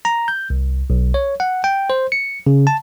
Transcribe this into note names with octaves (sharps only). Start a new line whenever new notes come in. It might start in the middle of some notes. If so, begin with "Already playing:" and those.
A#5
G6
C2
B1
C#5
F#5
G5
C5
C#7
C#3
A5